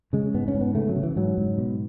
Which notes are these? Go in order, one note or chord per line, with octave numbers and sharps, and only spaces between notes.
C#3 G#3
G#2 B3
C#4
G#2
B3
C#3 A3
F#3
C#3
E3
G#2 F#3
G#2
B2